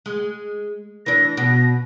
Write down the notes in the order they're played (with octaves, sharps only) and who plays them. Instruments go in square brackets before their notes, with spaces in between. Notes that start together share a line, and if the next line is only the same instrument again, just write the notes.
[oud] G#3
[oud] E3 D4 [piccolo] A#6
[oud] B2